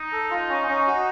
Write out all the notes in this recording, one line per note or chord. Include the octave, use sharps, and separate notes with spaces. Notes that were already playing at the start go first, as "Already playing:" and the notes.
Already playing: D#4
A4
F4
C#4
C#4
F#4